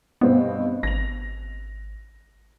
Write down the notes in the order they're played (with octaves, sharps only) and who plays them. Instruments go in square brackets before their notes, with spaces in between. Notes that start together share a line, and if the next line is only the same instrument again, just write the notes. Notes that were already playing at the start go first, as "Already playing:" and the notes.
[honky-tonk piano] G2 B2 C4 [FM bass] B3
[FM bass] G#1 [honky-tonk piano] A#6 F7